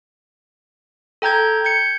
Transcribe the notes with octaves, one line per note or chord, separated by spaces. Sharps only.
A4 G5 A#5 G6 G#6
G6 G#6 C#7